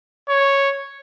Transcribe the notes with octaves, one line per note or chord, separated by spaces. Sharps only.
C#5